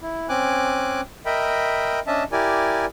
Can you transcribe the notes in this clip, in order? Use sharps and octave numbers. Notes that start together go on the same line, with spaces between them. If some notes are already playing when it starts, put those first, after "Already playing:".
E4
C4 C#4 G#5 D6 F#6
A#4 D#5 E5 G5 B5
C#4 D4 D#5 E5 A5
E4 G4 A#4 D5 G#5